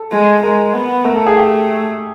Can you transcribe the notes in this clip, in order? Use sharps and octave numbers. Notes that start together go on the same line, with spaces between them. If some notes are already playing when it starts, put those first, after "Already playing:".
Already playing: A4
G#3
G#3 A#4
B3
A3 A#4
A4
G#4
G4